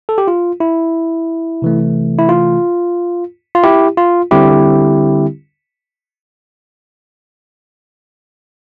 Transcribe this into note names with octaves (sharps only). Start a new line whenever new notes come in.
A4
G4
F4
E4
C3 E3 A3
E4
F4
F4
E4 G4
F4
D3 G3 C4 E4 G4